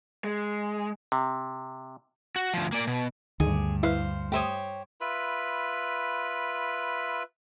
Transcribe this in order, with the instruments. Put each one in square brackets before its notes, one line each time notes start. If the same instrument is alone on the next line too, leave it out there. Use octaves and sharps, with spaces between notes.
[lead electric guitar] G#3
[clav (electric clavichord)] C3
[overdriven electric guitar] F#4
D2 F3
A#3 D5
B2
[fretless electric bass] D2 [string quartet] G2 [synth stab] D#3 [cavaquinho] G#4
[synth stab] E4 B4 E5 [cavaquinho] C5 F5
[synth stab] A3 E5 D#6 [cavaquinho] G4 C5 C#5
[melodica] F4 B4 E5 B5